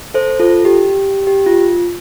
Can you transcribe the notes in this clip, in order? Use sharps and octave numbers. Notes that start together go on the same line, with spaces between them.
A4 C5
F4 A4
G4
G4
G4
F4